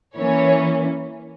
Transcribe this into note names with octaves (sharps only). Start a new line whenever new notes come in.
E3 A#3 C#4 C#5